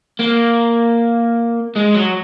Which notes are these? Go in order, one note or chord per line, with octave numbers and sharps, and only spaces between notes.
A#3
G#3
F#3